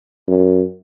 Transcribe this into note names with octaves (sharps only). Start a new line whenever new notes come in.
F#2